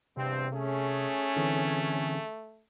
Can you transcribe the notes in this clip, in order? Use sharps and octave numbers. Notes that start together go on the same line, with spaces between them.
E2 G2 C3 C4
A3 C#4 G#4
D3 E3 C4